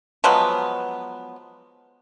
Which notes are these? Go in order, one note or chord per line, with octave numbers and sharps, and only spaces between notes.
F3 F#3 G#3 B3